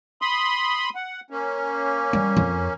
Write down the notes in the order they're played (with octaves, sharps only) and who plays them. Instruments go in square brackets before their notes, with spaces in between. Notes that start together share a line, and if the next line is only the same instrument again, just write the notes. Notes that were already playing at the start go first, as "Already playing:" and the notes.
[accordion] B5 C6 D#6
F#5
A#3 C#4
[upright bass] G3
F2